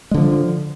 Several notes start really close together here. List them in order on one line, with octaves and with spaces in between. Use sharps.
G#3 D3 F3